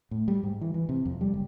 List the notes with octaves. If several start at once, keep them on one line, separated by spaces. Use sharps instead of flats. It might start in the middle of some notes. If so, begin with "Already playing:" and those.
A2
G3
G#2
E3
E3
C3
F2
G3
F#1